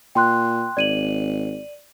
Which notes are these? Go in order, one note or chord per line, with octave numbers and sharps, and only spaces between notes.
A#2 G5 C6 F#6
G#1 D5 D#7 F#7